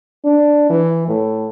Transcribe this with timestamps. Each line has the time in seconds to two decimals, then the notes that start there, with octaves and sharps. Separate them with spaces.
0.24 D4
0.70 E3
1.08 A2